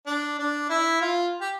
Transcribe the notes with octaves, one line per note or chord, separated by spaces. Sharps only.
D4
D4
E4
F4
G4